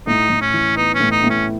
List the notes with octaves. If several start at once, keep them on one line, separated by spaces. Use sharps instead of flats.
A2 D#4
A2
C#4
E3
B3 D#4
C#4
A2
D#4
A2
C#4